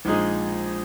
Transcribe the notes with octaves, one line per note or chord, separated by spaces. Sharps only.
A#1 A#2 G#3 D#4 G#4